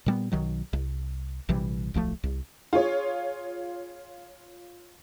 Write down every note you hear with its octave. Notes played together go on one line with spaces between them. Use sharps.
A#2 G3 B3
B1 D#3 F#3
C2
A#1 C3 E3 G3
D1 B1 F3 A3
C2
F4 G#4 C#5